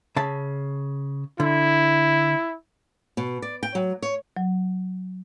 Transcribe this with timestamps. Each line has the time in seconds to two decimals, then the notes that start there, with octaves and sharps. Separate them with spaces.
0.16 C#3 E5 A5
1.40 D3 E4
3.17 B2
3.42 D5
3.63 G5
3.75 F#3
4.02 C#5
4.37 F#3